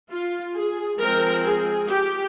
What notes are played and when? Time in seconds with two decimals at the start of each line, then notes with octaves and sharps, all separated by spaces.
0.11 F4
0.55 G#4
1.00 F3 G#3 C4 A#4
1.44 G#4
1.89 G4